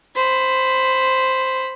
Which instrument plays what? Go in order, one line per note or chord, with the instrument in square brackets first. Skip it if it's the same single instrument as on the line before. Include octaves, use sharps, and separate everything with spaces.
[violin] C5 B5